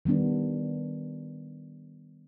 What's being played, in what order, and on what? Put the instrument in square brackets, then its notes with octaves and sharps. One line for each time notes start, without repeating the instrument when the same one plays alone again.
[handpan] D#3 G3 B3 D4